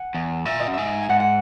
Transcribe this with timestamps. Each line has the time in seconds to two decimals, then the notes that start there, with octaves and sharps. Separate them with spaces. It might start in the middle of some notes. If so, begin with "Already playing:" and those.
Already playing: F#5 G#5
0.15 E2
0.45 A#2 E5
0.60 D#5
0.68 F#2
0.74 G#2 E5
1.03 G#5
1.09 G#2 F#5
1.20 F#5